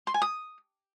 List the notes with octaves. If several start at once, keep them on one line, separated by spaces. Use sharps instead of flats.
C6
G#5
D#6